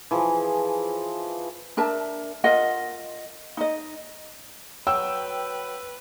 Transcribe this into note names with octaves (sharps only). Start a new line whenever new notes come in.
E3 F3 G#4
D4 A#4 E5 A5
F4 A#4 D#5 F#5
D#4 D#5
F#3 B4 G5 E6